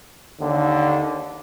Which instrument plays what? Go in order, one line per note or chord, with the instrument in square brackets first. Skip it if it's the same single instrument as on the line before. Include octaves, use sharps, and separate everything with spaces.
[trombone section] D#2 D3